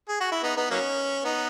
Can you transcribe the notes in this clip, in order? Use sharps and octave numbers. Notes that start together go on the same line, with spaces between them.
G#4
F#4
E4
B3 D#4
B3 D#4
F#3 A#3 C#4
B3 D#4